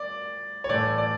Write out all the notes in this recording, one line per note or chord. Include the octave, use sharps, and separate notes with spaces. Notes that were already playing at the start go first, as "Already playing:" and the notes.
Already playing: D5
C#5
A2 E3 A3 D5
D5